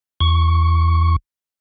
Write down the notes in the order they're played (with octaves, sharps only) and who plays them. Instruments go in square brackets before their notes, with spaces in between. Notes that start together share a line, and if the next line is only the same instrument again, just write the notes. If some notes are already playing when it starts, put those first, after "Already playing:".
[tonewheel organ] E2 C#6